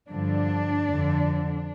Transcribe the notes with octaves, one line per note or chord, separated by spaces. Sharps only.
G2 D3 F3 D4
F2 D3 F3